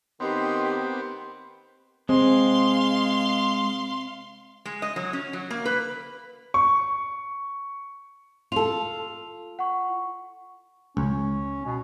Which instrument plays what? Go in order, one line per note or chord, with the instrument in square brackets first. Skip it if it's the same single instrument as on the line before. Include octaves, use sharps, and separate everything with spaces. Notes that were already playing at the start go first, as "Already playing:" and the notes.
[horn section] D#3 D#4 A#4 [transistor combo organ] B3 C4 [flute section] G4 B4 C6
[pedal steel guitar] G#3 [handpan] C4 [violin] F5 C6
[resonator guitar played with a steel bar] G#3
D#5
F#3
C#4
F#3
A#3
B4
[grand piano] C#6
[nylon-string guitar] F4 A4 [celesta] F7
[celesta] F#5 C#6
[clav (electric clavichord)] C#2 [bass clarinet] C#4
[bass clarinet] B2